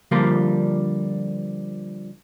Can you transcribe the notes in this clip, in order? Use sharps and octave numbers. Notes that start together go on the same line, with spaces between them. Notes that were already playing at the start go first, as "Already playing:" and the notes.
D3 F3 G3 A#3 D4 F4